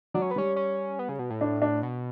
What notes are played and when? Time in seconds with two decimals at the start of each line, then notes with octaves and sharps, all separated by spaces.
0.14 F#3 D4
0.22 C#4
0.31 B3
0.36 G3 C#4
0.56 C#4
0.99 B3
1.09 C#3
1.19 B2
1.30 A2
1.41 D4
1.62 D4
1.83 B2